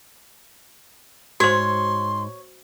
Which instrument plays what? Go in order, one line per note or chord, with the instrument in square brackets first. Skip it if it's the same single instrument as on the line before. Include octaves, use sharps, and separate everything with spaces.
[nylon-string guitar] G#2 [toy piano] F#4 C5 [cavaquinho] C#5 [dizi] C6